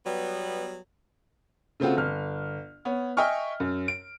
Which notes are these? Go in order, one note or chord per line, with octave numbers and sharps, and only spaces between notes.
F#3 G3 B3
C#3 A3 C4 F4 F#4
G1 F6
B3 C#5
D#5 E5 G5 G#5 C#6 F6
F#2
D7